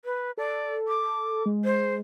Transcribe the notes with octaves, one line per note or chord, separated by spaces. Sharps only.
B4
A4 D5
D6
G#3
C5